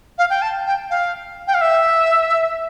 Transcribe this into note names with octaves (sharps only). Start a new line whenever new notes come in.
F5
G5
A5
G5
F5
G5
F5
E5